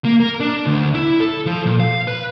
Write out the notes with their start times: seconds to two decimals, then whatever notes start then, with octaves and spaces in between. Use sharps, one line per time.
0.05 A#3
0.20 A#4
0.40 D4
0.66 D2
0.95 E4
1.20 A4
1.47 F3
1.66 A#2
1.80 F5
2.08 B4